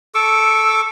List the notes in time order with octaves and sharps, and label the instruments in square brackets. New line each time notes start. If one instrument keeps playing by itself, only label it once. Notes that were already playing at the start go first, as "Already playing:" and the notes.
[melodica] A4 C#6 D6 E6